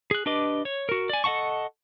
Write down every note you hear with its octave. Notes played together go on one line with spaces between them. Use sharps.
G#4 F#6
D4 G4 B4 D#5 D6
C#5
F#4 A#4
D5 G#5
A4 D#5 F#5 A5 C#6